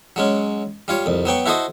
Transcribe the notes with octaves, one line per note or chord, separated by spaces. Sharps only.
F#3 G#3 C#4
G3 F4 C#5
C2 F2
F#3 B3 G5 C#6
E4 F#4 A4 C5 D#5 D#6